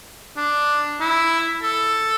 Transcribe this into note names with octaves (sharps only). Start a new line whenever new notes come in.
D4
E4
A4